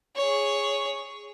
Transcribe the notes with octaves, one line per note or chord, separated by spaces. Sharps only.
G#4 C#5